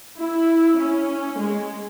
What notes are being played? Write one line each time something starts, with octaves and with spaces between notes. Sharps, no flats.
E4
C#4
G#3